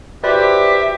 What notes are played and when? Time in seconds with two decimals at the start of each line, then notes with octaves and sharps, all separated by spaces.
0.24 E4 F#4 G4 B4 C5 D5 E5